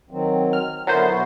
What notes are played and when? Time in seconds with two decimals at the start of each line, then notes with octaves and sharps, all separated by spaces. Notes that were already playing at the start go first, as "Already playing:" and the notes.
0.11 D#3 F#3 C4
0.53 F6
0.87 D3 F#3 B3 E4 A#4 C5
1.10 B2 E4 F#4